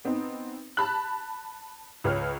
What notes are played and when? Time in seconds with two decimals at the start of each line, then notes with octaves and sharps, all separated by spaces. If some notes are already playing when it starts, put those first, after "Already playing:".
0.05 B3 C4 D#4
0.77 A5 B5 F#6
2.04 C#2 B4 C#5 F6